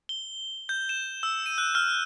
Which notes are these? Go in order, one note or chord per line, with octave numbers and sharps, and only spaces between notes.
G7
G6
E7
E6
D#7
F#6
F6